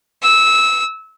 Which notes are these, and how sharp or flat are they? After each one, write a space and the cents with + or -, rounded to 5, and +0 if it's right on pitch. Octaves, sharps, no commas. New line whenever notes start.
E6 -20